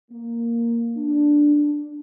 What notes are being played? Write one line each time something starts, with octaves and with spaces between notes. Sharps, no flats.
A#3
D4
D4